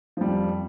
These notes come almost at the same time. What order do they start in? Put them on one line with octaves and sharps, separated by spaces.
F3 G3 F2